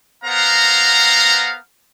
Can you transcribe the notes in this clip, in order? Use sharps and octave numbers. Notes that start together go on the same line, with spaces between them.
B3 A#4 C5 F5 F#5 A#5